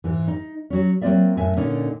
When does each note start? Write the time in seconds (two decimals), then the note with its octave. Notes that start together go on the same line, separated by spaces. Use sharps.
0.04 G#2 E3
0.28 D#4
0.70 F#3 C#4
1.01 F#3 A#3 C4 F4 D5 E5
1.37 F#2 A2 E5 G#5
1.57 A#2 D3 C#4 D#4